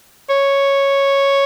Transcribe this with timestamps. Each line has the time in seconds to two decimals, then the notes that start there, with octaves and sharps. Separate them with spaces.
0.30 C#5